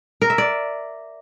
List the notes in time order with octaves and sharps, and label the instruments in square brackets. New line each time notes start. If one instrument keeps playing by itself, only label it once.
[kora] A#4
E5
D5